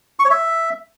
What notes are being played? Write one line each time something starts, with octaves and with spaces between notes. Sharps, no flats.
C#6
C#5
E5